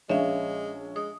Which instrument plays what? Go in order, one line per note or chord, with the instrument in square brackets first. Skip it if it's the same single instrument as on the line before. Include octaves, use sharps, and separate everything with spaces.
[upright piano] A#1 C#4 [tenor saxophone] G#3 [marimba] E5 F5
[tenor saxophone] G#3 [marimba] D#6